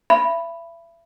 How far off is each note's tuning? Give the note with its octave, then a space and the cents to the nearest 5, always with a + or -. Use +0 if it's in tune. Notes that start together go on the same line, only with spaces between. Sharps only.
E5 +35 B5 +0